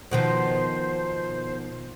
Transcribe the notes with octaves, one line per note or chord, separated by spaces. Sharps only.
B2 D#3 F3 C5